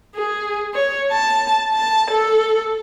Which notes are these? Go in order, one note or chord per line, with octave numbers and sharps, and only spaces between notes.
G#4
C#5
A5
A5
A4